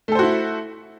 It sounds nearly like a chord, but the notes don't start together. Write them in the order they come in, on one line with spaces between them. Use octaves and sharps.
A3 A4 C5 F#4 E4